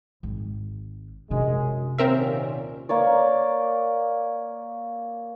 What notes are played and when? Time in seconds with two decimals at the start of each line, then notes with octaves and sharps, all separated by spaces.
0.23 G#1
1.30 F#2 C3 G#3 D4
1.98 D#2 A#2 C4 C#4 A#4 E5
2.89 A#3 C#5 D5